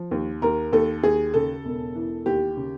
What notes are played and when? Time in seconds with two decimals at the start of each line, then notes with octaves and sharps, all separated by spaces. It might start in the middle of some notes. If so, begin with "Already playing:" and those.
Already playing: F3
0.11 D#2
0.42 D#2 A#4
0.73 D#2 A4
1.03 D#2 G#4
1.34 C#3 A4
1.65 E1
1.95 E3
2.26 D#2 G4
2.57 C#3